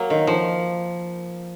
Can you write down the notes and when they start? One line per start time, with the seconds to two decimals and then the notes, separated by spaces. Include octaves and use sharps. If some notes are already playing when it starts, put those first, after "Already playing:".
Already playing: F#3 A#3
0.10 D#3
0.27 F3